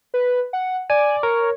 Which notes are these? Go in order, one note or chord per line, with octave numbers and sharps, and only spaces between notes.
B4
F#5
D5 G#5
A#4 C#5